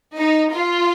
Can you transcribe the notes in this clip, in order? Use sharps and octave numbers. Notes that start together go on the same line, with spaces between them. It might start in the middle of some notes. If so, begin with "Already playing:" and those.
D#4
F4